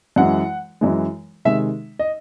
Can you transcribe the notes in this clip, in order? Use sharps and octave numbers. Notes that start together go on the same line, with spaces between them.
F#2 E3 G#3 F#5
F#2 E3 G#3
C3 D#3 G#3 E5
D#5